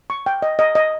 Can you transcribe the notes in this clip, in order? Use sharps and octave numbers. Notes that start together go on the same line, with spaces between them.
C#6
G5
D#5
D#5
D#5